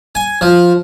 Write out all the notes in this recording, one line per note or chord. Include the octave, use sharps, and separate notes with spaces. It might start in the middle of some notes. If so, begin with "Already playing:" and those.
G#5
F3